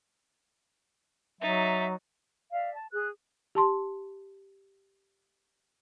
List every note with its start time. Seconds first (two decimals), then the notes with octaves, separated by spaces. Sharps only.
1.41 F#3 D#4 E5 A6
2.51 D5 E5 F5
2.73 A5
2.91 G#4 F#6
3.55 G4 A5 C6